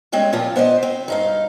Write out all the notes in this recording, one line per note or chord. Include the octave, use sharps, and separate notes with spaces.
G3 G#3 C4 C#4 C#5
A#2 F3 F4
B3 C5 D5 D#5
C4
G2 D#4 F5